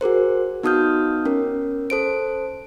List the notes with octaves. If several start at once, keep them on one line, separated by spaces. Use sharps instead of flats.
F#4 G#4 A#4 C5
B3 D#4 F#4 D#6 F6 G6
C#4 A#4
A4 C5 D7